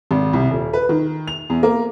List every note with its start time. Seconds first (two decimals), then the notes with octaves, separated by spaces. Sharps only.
0.11 G#1
0.33 C2
0.50 D#1
0.73 B4
0.89 D#3
1.28 F7
1.50 E2
1.63 A#3